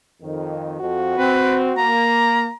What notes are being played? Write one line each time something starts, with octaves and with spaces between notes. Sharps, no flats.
F2 D#3
F2 F#4
C4 B4
A#3 A#5